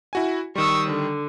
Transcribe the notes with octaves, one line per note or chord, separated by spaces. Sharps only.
E4 F#4 G#5
D#3 G3 C#6 D#6 E6
D3